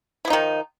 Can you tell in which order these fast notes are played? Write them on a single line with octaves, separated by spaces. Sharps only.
E4 F3 D#4 D#3